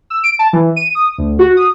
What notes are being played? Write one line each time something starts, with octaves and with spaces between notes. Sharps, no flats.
E6
D7
A5
E3
D#7
D#6
D2
F#4
D#6